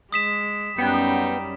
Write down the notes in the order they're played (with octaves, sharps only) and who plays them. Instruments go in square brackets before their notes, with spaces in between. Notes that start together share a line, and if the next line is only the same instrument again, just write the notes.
[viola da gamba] G#3 [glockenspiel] D#6 B6 E7
[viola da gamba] F#2 G3 C#4 [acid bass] B3 [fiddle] D#4 G5